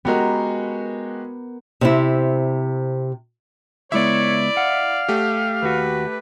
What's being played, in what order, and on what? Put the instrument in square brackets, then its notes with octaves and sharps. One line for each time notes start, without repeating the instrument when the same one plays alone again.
[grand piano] G#3 F#4 G4 [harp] B3 A#4
[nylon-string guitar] C3 C4 E4
[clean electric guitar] C#2 G#3 B3 [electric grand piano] E4 E5 [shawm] C#5 [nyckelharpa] D5
[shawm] F5 [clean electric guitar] F#5
[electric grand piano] A3 G4
[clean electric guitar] D#2 F#4 [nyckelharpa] B4